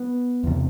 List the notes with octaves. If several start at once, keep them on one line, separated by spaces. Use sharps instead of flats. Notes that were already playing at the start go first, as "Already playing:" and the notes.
Already playing: B3
E2 C3